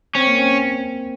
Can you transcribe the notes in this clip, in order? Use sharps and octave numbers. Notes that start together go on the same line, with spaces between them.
C4 C#4
A#3
C4